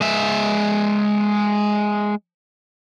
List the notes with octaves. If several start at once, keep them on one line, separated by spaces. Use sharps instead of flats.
G#3 E5